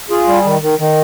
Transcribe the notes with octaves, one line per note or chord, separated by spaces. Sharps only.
F4 G#4
G3
D#3
D#3
D#3